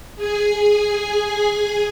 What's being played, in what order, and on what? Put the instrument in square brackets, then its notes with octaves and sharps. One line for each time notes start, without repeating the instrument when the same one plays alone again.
[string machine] G#4 G#5